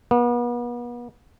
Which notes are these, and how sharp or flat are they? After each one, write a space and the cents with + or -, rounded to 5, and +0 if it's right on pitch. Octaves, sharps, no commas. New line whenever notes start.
B3 -40